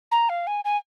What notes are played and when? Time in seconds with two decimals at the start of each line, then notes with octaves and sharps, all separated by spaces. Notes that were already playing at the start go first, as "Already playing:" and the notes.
0.11 A#5
0.29 F5
0.47 G#5
0.65 G#5